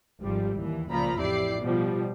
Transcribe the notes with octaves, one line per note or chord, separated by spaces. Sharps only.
G#1 F3 G3
D#2 E3
C#2 A#2 F3 F4 A#5 B5
A1 F2 E4 G4 D5 C7
B2 F3 G3